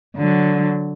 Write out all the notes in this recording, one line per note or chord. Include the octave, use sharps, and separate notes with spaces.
D3 F#3